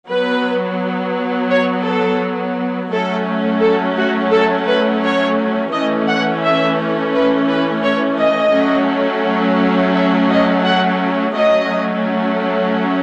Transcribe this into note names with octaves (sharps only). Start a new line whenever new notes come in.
F#3 B3 B4
C#5
A4
F#3 A3 C#4 A4
A4
F#4
A4
B4
C#5
E3 A3 C#4 D#5
F#5
E5
B4
B4
C#5
D#5
F#3 A3 C#4
E5
D#5
F#5
F#3 A3 C#4 D#5